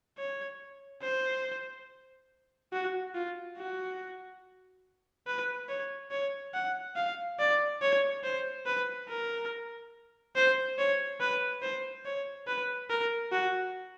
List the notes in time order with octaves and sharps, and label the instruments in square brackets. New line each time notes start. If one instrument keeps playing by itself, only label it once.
[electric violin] C#5
C5
F#4
F4
F#4
B4
C#5
C#5
F#5
F5
D5
C#5
C5
B4
A#4
C5
C#5
B4
C5
C#5
B4
A#4
F#4